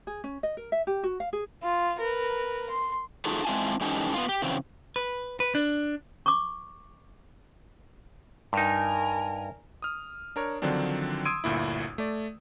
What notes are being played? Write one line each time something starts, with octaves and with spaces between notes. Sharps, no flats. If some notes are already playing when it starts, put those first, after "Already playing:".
G#4
C#4
D#5
A#4
E5
G4
F#4
F5
G#4
F4
A#4 B4
C6
A3 D#4 F4 F#4 G#4 A4
G#3 C4 E4 F4 G#5 A5
G#2 E3 C#4 D#4 G4 A4
B3 F4
G4
C#3 E3 F#3 C4
B4
B4
D4
C#6 D6
G2 D#4 A#4 G#5
D#6 F6
D4 A#4 C#5
D3 D#3 F3 F#3 C4 D4
C6 D#6 E6 G#6 D7 D#7
G1 D2 A#2 E4
A3 D5